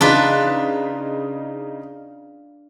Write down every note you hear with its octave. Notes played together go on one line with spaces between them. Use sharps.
C#3 D4 D#4 F4 B4